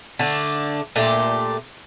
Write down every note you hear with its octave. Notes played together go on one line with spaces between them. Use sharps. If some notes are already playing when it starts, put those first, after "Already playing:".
D3 A3 D4
A#2 A3 D4 G4